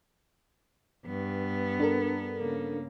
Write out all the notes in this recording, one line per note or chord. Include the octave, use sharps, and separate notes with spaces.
G2 B3
D4 A4 A#4
C#3 A#3